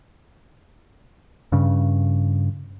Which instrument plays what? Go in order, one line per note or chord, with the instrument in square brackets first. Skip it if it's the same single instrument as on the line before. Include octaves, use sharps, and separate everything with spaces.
[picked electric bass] G2 C#3